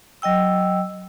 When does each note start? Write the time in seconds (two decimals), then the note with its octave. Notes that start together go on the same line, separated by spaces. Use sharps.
0.22 F#3 D#5 G5 E6